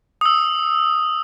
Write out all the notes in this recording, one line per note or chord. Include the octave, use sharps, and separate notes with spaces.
D#6 E6